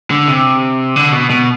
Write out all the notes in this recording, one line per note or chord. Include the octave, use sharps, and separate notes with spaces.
D3
C3
D3
B2
B2